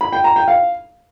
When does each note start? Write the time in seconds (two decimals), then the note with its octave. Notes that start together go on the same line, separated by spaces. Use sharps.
0.01 B5
0.13 G5
0.24 A#5
0.36 G5
0.48 F5